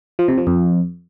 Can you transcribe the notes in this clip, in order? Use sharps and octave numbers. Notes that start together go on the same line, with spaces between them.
F3
C3
F3
F2